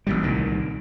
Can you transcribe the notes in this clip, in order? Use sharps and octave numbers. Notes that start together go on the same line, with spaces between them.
A1 A#2 G3
C2 A#2 D#3